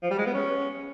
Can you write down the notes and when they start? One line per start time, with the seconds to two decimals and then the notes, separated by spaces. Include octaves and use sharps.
0.03 F3
0.11 G3
0.18 G#3
0.26 B3
0.34 C#4